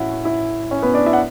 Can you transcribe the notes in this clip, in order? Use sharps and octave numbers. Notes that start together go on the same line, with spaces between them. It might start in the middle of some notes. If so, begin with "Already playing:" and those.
Already playing: A2 E3 C#4 E4 F#4 E5 F#5
E4 E5
C#4 C#5
B3 B4
D4 D5
E4 E5
F#5